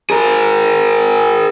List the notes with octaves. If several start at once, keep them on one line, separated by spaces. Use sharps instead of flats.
G#4 A#4